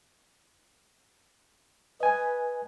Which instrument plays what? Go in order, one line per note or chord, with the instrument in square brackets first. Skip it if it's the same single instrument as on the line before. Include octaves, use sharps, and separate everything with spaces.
[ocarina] B4 [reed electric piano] D#5 G#5